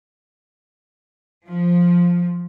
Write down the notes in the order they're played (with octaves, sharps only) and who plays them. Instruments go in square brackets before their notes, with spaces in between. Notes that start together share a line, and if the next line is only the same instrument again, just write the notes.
[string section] F3